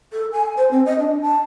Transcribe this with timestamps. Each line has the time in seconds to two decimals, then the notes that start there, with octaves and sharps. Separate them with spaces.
0.13 A4
0.32 G#5
0.57 C5
0.71 C4
0.86 D#5
0.99 D4
1.22 A5